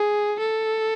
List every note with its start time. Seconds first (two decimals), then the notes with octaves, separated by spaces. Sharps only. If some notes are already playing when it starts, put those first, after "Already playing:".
Already playing: G#4
0.40 A4